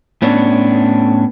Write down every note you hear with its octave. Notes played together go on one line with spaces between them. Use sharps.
A2 B3 C#4 D4